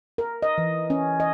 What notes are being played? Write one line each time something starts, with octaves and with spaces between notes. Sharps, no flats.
A#4
D#5
E3
C#4
D#5